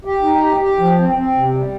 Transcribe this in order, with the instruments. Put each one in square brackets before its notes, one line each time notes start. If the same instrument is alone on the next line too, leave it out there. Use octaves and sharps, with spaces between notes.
[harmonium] G4
D#4
G4
G4
F3
C4
C4
C3
G3